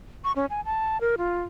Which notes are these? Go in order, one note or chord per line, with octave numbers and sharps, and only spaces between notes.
C#6
C#4
G#5
A5
A#4
F4